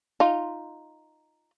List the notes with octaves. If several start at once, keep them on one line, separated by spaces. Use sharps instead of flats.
D#4 F4